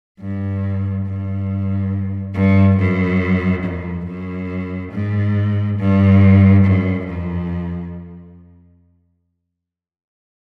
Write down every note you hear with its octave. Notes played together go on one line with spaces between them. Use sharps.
G2
G2
G2
F#2
F2
F#2
G#2
G2
F#2
F2